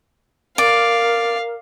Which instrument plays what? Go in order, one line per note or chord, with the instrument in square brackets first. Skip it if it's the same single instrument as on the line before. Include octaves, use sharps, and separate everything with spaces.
[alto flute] A#4 [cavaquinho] D5 [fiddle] F5